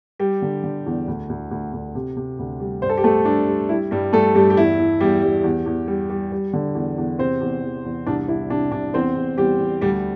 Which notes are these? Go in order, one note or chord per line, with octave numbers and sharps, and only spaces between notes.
G3 G4
D3
D3
E2
D2
D2
D2
D2
C3
C3
D2
G3
G2 C5
A4
G4
G3 A3 A4
G3 D4
G3
G3 E4
G2 G3 G4
G2 A3 A4
G2 G3 G4
G4
E2 E4
E3
E2 G3 G4
G3
E2
E2
G3
G3
G3
D3
E2
E2
C3 C4 C5
E2
E2
E2
C2 D4
C2 E4
C3 D4
C3 D4
E2 C4 C5
E2
E2 G3 G4
E2
D2 G3 G4